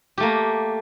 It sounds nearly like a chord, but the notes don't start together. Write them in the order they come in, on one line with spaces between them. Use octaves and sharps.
G4 A3 A#3